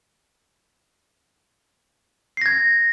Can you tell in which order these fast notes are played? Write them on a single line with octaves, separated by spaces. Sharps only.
C7 A#6 G#6